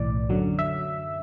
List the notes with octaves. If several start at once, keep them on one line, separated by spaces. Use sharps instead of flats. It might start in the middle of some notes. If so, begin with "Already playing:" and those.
Already playing: B1 A2 E3 D5
F#2 D3 F#3
E5